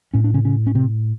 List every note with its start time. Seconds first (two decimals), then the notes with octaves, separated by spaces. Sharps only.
0.14 A2 C#4
0.24 D4
0.34 C#3 C#4
0.45 C#3 C#4
0.67 C#4
0.75 C3 C4